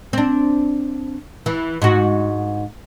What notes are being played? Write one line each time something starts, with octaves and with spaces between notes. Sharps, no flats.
C4 D4
E3
G#2 F#4